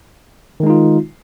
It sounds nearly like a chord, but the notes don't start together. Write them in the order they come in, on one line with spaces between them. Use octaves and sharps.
D#3 G#3 D#4 F4